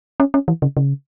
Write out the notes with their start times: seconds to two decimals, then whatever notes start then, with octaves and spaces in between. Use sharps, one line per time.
0.20 C#4
0.34 C#4
0.48 E3
0.62 C#3
0.77 C#3